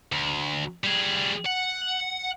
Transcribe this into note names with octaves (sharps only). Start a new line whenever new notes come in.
D2
G3 G#4
F#5